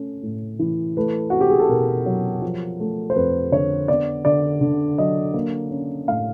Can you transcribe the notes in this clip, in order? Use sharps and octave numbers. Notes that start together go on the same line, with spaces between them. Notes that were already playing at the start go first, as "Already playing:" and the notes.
Already playing: A3 C#4
A2
E3
A3 B4
C4 F#4
G4
G#4
A4
B2 A#4
F#3
F3
A3
C5
F2 B4
D3 C#5
B3 D5
D3 D5
D3
F#3 D#5
A#3
C#4
A2 F5